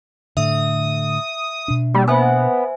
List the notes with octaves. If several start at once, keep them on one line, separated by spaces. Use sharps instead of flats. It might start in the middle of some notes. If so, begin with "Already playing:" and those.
A2 D3 E5 D#6
B2 D4
G3 A#3
B3 C5 E5 G#5